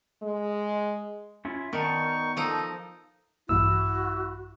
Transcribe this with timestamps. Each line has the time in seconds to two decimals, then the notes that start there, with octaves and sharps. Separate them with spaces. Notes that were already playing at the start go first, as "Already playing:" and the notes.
0.23 G#3
1.45 C#4 E4 F4
1.73 D#3 B3 D#4 D5 A5 C#6
2.37 F3 D#4 A4
3.49 A#1 G2 E3 E4 F#4 E6